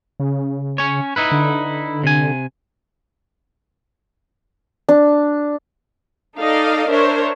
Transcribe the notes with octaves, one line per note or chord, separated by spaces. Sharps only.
C#3
C#4 C#5
D#4 E4 B4
D3
C3 G#5
D4
D#4 A4 D5 D#5 F5
D4 A#4 C5 C#5 E5